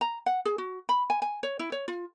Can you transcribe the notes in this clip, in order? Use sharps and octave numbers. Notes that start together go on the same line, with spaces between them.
A#5
F#5
G#4
F#4
B5
G#5
G#5
C#5
E4
C#5
F4